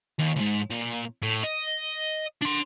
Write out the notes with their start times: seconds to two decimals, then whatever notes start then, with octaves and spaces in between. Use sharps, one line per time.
0.19 D#2
0.37 C#2 G#2
0.71 A#2
1.23 A2
1.44 D#5
2.42 D4 C6